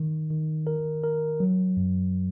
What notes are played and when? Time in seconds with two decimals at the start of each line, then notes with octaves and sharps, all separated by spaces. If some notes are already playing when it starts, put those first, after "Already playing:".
Already playing: D#3
0.31 D#3
0.67 A#4
1.04 A#4
1.40 F#3
1.77 F#2